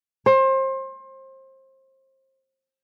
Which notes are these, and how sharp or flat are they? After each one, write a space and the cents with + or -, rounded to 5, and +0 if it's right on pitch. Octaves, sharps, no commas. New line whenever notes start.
C5 +30